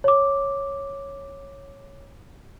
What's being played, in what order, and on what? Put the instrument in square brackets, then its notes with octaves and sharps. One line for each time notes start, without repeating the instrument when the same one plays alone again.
[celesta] C#5 D6